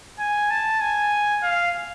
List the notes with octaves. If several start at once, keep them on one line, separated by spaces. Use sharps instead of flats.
G#5
A5
G#5
F5